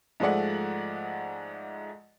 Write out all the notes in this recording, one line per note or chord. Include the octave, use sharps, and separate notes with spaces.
G#2 F3 G#3 A3 D5 F#5